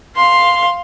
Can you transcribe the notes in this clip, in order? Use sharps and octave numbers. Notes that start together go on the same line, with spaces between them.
F5 C6